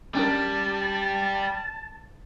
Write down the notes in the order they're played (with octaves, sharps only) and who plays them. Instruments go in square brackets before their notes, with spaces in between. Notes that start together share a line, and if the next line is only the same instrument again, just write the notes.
[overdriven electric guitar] G3 [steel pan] C#4 D4 A#4 [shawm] A5